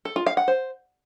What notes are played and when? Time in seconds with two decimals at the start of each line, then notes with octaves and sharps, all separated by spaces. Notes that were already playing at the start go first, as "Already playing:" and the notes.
0.05 A4
0.16 F4
0.26 F5
0.37 F#5
0.48 C5